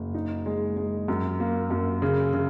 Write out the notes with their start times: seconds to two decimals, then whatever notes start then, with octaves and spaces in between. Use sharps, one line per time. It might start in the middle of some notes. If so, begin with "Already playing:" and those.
Already playing: F#1
0.14 D#4
0.46 G#3
0.77 G#3
1.08 F#2
1.40 A#3
1.70 F#2
2.02 C#3
2.33 C#3